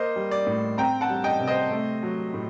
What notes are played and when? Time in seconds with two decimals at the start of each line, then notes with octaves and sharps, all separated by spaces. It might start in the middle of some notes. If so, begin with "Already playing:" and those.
Already playing: A#3 C5 D#5
0.16 G3
0.31 D5
0.47 A2
0.78 C4 G5 A#5
1.01 F#5 A5
1.09 G3
1.24 D#5 G5
1.40 C3
1.48 C5 D#5
1.71 A3
2.03 F#3
2.34 A2